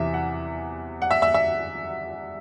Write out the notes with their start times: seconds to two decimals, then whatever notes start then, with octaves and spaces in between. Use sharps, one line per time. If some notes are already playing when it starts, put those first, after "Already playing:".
Already playing: E2 C3 E3 E5
0.14 F#5
1.02 F#5
1.11 E5
1.22 E5
1.34 E5